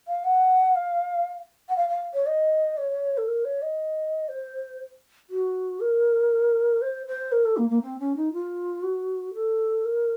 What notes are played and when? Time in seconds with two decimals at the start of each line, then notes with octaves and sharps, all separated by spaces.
0.08 F5
0.24 F#5
0.76 F5
1.69 F#5
1.76 F5
1.89 F5
2.14 C#5
2.27 D#5
2.77 C#5
3.18 A4
3.28 A#4
3.45 C#5
3.62 D#5
4.29 C5
5.30 F#4
5.80 A#4
6.82 C5
7.07 C5
7.32 A#4
7.45 A4
7.57 A#3
7.70 A#3
7.82 C4
7.99 C#4
8.16 D#4
8.33 F4
8.83 F#4
9.34 A4
9.85 A#4